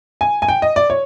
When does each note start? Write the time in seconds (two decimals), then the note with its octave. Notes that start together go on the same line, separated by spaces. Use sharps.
0.21 G#5
0.42 G#5
0.48 G5
0.62 D#5
0.76 D5
0.90 C#5